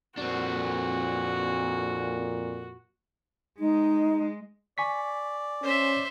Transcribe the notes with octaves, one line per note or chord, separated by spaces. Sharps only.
F2 A#2 C4 D4 F#4
G#3 D#4
D5 G#5 C#6 B6
C#4 C5 E5